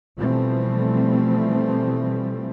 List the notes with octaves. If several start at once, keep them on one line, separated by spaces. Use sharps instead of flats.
B2 E3 F3 G3 A3 C4